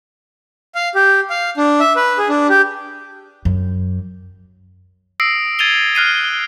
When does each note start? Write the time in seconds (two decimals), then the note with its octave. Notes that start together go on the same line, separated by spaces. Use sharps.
0.75 F5
0.95 G4
1.30 F5
1.57 D4
1.80 E5
1.96 B4
2.18 G#4
2.29 D4
2.49 G4
3.45 F#2
5.20 D#6 E6 A#6 C7 D7
5.59 G#6 A6 D#7 F7 G7
5.95 F6 F#6 C7 D#7